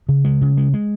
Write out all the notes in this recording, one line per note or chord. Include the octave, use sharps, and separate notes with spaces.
C#3
G#3
C#3
G#3
G#3